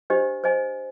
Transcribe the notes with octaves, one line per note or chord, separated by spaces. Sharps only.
D4 G4 C5 D#5
C5 D#5 G#5